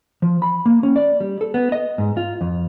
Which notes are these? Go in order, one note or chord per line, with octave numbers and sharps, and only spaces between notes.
F3
B5
A#3
C#4
D5
G3
A4
B3
D#5
G#2
F4
F2